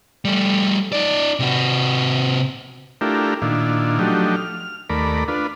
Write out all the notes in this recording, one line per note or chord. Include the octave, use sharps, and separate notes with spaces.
G3 A3
D#4 D5
C3 F#4
A3 D4 E4 F4 G4 A#4
A#2 D#3 D4 E4 F4
F3 F#3 A3 D4 D#4 G4
F6
D#2 A3 A#4 D5 B5
D4 F4 B4